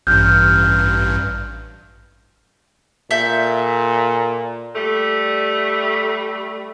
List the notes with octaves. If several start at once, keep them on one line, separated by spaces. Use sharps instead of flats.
A1 G2 F6 G6
A#2 A4 E5 G6
G3 A3